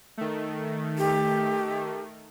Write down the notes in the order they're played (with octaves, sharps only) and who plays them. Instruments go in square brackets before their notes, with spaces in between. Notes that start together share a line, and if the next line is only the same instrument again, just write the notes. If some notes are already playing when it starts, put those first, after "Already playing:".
[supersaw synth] D#3 A3
[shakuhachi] G4